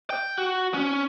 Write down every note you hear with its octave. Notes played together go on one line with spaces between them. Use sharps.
G5
F#4
C#4